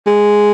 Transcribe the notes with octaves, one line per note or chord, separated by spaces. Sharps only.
G#3